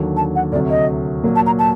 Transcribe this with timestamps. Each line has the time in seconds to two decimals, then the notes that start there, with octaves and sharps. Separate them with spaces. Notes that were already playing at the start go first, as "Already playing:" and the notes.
Already playing: D#2 D3 F#3
0.17 A5
0.36 F#5
0.52 D2 C3 F#3 D5
0.70 D#5
1.23 A#2 F#3 A#3
1.36 A5
1.46 A#5
1.59 A5